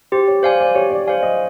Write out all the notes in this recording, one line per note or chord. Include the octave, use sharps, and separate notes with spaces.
G4 C5
C#5
C5 D5 F5 G#5
D5
G4 C#5
D5
C5 D5 F5 G#5
D#5